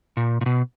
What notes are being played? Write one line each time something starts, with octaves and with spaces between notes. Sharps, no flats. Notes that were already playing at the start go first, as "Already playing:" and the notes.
A#2
A#2
B2